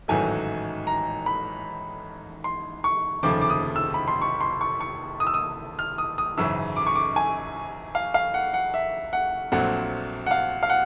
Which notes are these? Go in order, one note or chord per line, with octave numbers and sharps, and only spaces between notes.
A1 G#2 D#3 F#3 A3 G#5
A#5
B5
C6
C#6
F1 D#2 C#3 F3 A3 D6
D6
D#6
E6
B5
C6
C#6
C6
C#6
C#6
D#6
E6
D#6
F6
D#6
D#6
G#1 F#2 C#3 E3 E6
D6
C#6
D6
G#5
F5
F5
F#5
F#5
E5
F#5
A#1 A#2 F#3 A3 C4 F#5
F#5
F5
F5
F#5